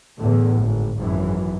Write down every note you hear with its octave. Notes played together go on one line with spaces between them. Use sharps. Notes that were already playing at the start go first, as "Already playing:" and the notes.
E2 A2 D3
G#1
G#1 F#2 E3